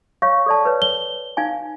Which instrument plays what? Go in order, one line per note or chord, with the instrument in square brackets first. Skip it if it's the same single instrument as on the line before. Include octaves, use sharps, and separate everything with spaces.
[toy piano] C#5 F5 [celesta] C#6
[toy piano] A4 D5 A5
B4 C#5
[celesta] G7
[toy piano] D#4 F5 G#5